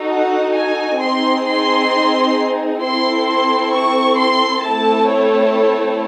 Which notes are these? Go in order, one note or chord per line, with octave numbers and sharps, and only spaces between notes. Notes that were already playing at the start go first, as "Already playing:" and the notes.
Already playing: D#4 F#4 A4
F#5
G#5
C4 D#4 G#4 C6
C6
C4 E4 A4 C6
C6
C#6
C6
A3 C4 E4 A4 A5
C#5